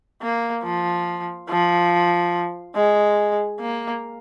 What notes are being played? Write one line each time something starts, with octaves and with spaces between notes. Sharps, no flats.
A#3
F3
F3
G#3
A#3